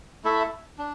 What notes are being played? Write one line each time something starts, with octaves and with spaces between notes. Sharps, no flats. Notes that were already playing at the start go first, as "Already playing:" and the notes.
A3 E4 A4 E5
D4